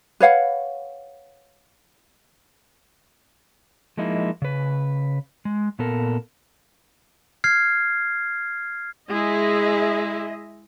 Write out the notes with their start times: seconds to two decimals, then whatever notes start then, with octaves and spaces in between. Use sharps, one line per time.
0.20 B4 C#5 F5 F#5
3.97 F3 G#3 A#3 D#4 E4
4.42 C#3 B4
5.45 G#3
5.79 A#2 B3 A4 A#4
7.44 F6 G#6 C7
9.10 G#3 E4 G#4 D#5 E5